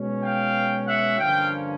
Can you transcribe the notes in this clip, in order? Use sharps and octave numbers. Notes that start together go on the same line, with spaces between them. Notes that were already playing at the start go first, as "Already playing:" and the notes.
Already playing: B2 G#3 C#4
F5 G5
E5 F#5
G2 D3 F3 A#3 C#4 F5 G5